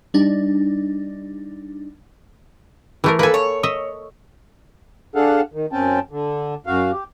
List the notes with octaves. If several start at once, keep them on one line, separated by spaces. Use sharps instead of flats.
G3 D4 D#4
E3 A3 A#4
A#3 A4 B4 G#5
C#5
D#5 E5
D4 G#4 A4 F5 F#5
D#3
F#2 C4 C#4 G5 A5
D3
F#2 F#4 F5
G4